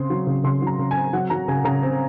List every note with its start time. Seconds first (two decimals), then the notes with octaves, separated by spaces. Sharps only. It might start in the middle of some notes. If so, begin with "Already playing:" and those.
Already playing: C#3 C4 C6
0.10 F#3
0.27 C#3
0.44 C#3 C6
0.62 F#3 A#5
0.79 C#3
0.91 G#5
0.96 C4
1.13 F#3 F#5
1.30 F#3 A#5
1.48 C#3 G#5
1.64 C#3 A#5
1.83 C4